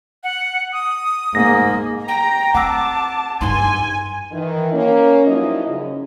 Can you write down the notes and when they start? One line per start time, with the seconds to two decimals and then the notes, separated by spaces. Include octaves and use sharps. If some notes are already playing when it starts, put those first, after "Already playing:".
0.24 F#5
0.73 D#6
1.35 G#2 A#3 A#6
2.08 G5 A#5
2.54 C4 F#5 A5 D6 E6
3.41 G2 D#4 G#5 C6
4.32 D#3 E3
4.73 A#3 C#4
5.26 G2 F3 F#3 D#4 E4 D#5
5.67 F#2 C#3